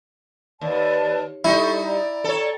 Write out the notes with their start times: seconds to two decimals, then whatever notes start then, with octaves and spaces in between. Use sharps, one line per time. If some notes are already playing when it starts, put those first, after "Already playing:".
0.61 D#2 B4 D5 A5
1.45 G3 D#4 E4 A4 C#6
1.83 D5 G5 A#5
2.24 A4 C#5